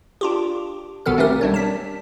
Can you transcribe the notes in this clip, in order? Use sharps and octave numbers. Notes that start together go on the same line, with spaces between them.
D4 F4 G4
B1 B2 D#3 B3 A4 F6
A3 C4 C#4 G4 A#4
G3 D4 C#5
A5 B6